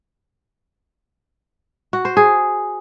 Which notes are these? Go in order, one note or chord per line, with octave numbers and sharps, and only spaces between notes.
F#4
C5
G#4